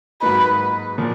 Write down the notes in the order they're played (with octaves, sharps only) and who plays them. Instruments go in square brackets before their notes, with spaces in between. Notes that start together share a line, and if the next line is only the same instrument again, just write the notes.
[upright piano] G#2 F#3 A#3 D#4 [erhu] B4
[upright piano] A#2 F3